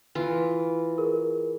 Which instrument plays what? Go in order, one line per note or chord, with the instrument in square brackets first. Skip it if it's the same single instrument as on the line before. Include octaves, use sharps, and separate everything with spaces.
[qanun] E3 F4
[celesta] G#4 A#4